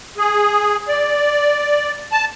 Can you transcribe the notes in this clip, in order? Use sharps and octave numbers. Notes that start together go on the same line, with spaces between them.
G#4
D5
A5